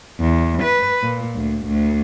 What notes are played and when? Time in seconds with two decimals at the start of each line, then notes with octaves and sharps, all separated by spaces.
0.20 E2
0.63 B4
1.03 A#2
1.36 D2
1.66 D2